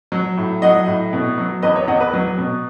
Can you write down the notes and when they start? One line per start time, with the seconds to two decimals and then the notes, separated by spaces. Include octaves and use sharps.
0.12 F#3
0.37 A2
0.62 F#3 D#5 F#5
0.87 A2
1.13 B2
1.38 F#3
1.62 E2 B4 D#5
1.76 C#5
1.88 E2 D#5 F#5
2.00 B4
2.13 F#3
2.38 B2